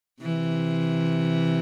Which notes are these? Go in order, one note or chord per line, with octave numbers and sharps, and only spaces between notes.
C3 E3